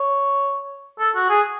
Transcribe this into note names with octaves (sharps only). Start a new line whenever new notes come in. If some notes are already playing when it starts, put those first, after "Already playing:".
Already playing: C#5
A4
F#4
G#4